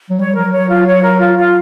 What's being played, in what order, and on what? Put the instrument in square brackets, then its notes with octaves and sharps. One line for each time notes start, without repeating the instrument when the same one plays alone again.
[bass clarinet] F#3
[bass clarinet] G3 [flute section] C#5
[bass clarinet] F3 [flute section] A#4
[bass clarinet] F#3
[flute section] C#5
F4
C#5
A#4
F4
F4